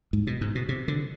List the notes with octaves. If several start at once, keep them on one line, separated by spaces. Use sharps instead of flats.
G#2
B2
G#2
B2
C3
D3